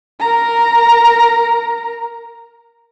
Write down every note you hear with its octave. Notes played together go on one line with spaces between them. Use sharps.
A#4 A#5